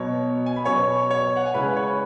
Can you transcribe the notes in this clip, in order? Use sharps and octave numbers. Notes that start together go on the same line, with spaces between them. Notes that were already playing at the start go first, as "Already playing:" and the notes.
Already playing: B2 F#3 B3 C#5
G#5
B5
B2 F#3 B3 C#5 C#6
C#5 C#6
F#5
G#5
C#3 G#3 E4 B4 B5
C#5 C#6